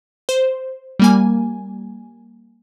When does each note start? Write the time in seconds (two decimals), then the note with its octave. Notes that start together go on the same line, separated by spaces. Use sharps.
0.29 C5
0.99 G3 A#3 G#5